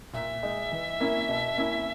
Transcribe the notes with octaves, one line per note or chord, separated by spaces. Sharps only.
A#2 E5
G#3 D#4
E3
A#3 C#4 E4
B2
A#3 C#4 E4